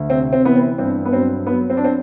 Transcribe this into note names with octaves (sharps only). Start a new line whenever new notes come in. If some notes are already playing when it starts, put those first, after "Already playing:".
Already playing: D2
C3 C4
C4
E3 B3
C4
G2 C4
B3
F#3 C4
F#3 B3
C4
D4
C4